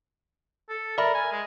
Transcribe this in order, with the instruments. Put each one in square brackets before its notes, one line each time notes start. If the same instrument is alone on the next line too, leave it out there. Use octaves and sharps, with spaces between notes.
[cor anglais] A4
[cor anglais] A#4 [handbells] D5 E5 B5
[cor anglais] G#5
G#3